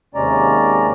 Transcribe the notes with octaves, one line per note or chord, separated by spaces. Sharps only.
D#2 C3 G#3 C#4 D5 A#5